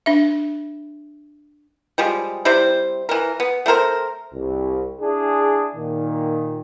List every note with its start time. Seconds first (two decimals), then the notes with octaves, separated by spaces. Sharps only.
0.06 D4 E5
1.98 F3 G3 G#3
2.45 C3 G3 E4 C5
3.09 E3 A#4
3.40 B3
3.66 A3 C4 A#4 C5
4.34 C2
5.01 D4 E4 G#4
5.76 A#2 D#3